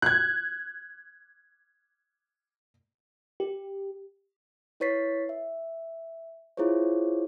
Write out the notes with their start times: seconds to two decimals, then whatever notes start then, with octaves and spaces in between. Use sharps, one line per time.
0.02 F#6 G#6
3.40 G4
4.80 E4 B4 C#5 A6 B6 C7
5.29 E5
6.57 E4 F4 G#4 C5 C#5